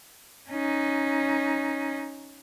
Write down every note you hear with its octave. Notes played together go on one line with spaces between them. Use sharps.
C#4 D#4